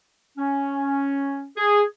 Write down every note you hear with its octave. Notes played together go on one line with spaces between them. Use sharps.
C#4
G#4